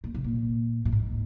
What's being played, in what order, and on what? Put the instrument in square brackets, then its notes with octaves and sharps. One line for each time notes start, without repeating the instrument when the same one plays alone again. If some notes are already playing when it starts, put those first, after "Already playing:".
[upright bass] A#2
C3
A#2
A#2
G#2